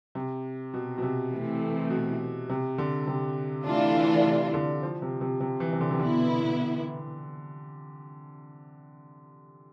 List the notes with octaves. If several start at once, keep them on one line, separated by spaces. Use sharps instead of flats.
C3
B2
B2
C3
E3 A3 C4
B2
C3
D3
C3
E3 A3 D4 F4
C3
D3
F3
C3
C3
C3
E3
C3
D3
C3
B2 D3 B3 E4